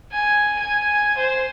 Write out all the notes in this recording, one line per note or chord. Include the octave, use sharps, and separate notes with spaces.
G#5
G#5
C5